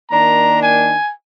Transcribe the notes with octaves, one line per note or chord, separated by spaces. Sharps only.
D#3 A#3 D4 A#5
G#5